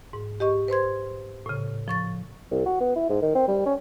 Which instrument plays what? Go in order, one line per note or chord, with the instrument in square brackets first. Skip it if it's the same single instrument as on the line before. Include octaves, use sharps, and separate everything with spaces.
[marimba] G#2
G4 D#5 C#6
B4 C5 C6 G#6
A2 C#3
F3 C#6 A6
[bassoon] C2
F#4
B3
E4
G#2
D#3
C4
G3
C#4